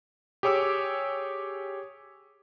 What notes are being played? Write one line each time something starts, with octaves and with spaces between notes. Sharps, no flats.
G4 G#4 C#5 D6 E6